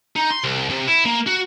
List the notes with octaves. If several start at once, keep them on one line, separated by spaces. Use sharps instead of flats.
D#4
C6
C2
C3
E4
A#3
F#4